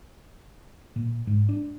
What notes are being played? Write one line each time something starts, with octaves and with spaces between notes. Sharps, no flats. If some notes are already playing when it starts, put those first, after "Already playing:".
A#2
G#2
D4